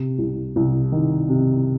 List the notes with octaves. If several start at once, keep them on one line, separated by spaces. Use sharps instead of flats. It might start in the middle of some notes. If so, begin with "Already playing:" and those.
Already playing: C3
C2
C2
D#3
C3